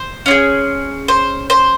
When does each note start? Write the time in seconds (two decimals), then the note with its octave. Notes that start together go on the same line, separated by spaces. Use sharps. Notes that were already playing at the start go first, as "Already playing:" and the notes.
Already playing: C5
0.26 C#4 F4
0.31 G#4
1.08 C5
1.50 C5